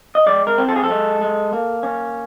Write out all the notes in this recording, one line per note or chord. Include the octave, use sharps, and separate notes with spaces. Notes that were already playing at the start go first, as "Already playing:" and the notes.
D#5
G#3 D5
A#4
C4
A4
G#4
A4
G#3
G#3
A#3
C#4